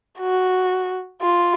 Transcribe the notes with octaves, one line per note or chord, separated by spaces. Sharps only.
F#4
F4